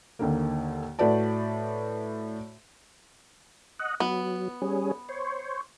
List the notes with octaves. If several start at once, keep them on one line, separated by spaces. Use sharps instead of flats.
D#2 D3 A#3
A2 F#4 B4 D5 A5
D#5 F#5
F#3 B3
G3 C#4 G#4
C5 C#5